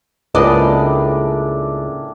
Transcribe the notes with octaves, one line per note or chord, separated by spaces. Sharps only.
C#2 A2 A#3 D4 G#4 B4 D5 D#5